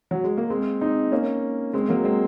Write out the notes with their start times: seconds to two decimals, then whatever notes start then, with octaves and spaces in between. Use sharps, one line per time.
0.11 F#3
0.24 G#3
0.37 A#3
0.50 G#3 C4
0.81 C4 D#4
1.12 A#3 C#4
1.73 G#3 C4
1.88 F#3 A#3
2.04 G#3 C4